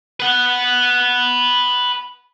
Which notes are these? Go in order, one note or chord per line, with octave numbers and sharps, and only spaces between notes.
B4 F#5